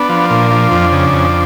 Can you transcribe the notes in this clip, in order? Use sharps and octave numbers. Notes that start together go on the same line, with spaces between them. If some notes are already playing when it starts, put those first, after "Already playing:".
Already playing: B3 D4
F3
A#2
F3
F2
C#3
F2